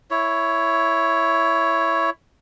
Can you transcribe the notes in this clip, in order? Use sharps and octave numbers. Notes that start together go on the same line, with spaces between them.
E4 C#5